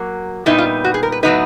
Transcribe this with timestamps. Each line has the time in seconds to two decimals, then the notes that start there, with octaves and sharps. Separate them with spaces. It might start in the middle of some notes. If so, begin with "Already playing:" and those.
Already playing: F#3 A#3
0.46 A#2 G3 B3 D#4 E4
0.58 F4
0.84 F#4
0.94 G#4
1.03 A#4
1.12 B4
1.23 A2 F#3 B3 D#4 B4